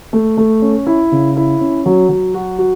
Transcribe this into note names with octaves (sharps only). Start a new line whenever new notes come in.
A3
A3
C#4
E4
C#3
E4
C#4
F#3
F#3
F#4
F#4